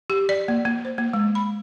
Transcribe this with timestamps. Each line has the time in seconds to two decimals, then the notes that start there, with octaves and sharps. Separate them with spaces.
0.10 G4
0.29 D5
0.48 A#3
0.65 A#3
0.85 C5
0.98 A#3
1.13 G#3
1.35 B5